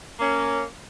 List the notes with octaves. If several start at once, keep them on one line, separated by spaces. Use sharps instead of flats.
A#3 C#4